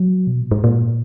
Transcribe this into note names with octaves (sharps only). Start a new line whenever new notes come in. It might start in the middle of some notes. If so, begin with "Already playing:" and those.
Already playing: F#3
B2
A#2
G#2
A#2